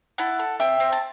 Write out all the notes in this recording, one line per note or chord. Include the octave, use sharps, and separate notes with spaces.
E4 F#5 A5
A4
C4 E5 G5
C4
A5